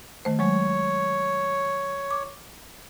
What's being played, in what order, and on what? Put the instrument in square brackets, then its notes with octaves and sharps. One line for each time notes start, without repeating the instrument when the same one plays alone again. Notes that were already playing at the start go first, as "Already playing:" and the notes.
[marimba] D#3 A3 C5
[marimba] F#3 G#3 [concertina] C#5
[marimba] D6